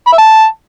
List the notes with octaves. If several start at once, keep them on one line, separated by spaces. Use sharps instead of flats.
B5
E5
A5